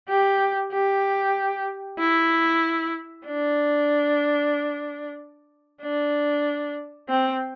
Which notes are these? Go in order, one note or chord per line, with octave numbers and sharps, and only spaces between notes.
G4
G4
E4
D4
D4
C4